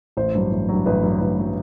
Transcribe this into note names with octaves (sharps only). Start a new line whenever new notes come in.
A1 C5
G2 F#3
A1
G2 F#3
A1 B4
G2 F#3
A1
F#3